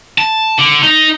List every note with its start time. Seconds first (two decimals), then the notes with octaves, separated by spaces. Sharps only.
0.18 A5
0.59 D3
0.83 D#4 D#5